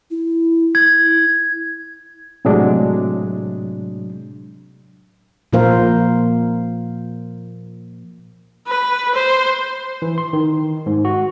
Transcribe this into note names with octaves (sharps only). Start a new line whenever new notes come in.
E4
G#6
A2 C3 F#3 G#3 D4
A#2 F3 A#3 A#4 C5 F5
B4
C5
E3
C6
D#3
G#2
F#4